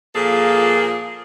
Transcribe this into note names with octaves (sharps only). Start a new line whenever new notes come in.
A#2 F3 A#3 G#4 A4